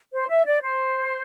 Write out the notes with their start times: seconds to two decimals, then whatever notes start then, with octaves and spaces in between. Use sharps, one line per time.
0.13 C5
0.29 E5
0.46 D5
0.62 C5